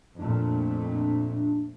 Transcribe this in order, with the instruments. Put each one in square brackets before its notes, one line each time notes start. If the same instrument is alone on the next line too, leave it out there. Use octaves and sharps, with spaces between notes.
[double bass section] F2 A#2 A3 [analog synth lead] D4